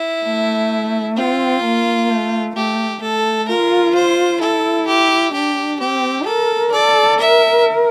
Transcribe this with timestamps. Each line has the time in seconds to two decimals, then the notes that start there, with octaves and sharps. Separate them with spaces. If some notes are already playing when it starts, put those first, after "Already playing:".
Already playing: E4
0.24 A3
1.17 C4 F4
1.63 A#3
2.09 A3
2.56 A3 G4
3.02 A3 A4
3.48 F4 A#4
3.95 C5
4.41 E4 A4
4.87 G4
5.34 D4 G4
5.80 C4 G4
6.26 A4 A#4
6.72 A4 D5
7.19 A#4 E5